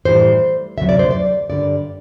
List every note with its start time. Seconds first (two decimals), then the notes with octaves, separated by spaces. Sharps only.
0.05 A2 E3 G3 C5
0.77 D2 C3 F#3 E5
0.89 D5
0.99 C5
1.11 D5
1.49 G2 D3 G3 D5